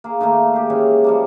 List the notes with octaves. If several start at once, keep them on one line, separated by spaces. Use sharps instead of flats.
A#3 G#4
D#3 A3 A#3
G4 G#4
E3 G#3 C#4 C#5
F3 G3 A#3